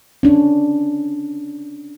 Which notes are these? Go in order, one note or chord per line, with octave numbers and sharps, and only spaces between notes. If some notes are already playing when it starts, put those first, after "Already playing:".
C#4 D4